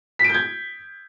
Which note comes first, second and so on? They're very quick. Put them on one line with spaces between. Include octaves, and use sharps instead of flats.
B6 D7 G6 G#6